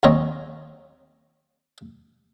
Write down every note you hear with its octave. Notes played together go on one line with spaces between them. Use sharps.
D#2 A#2 D#3 C4 C#5 D#5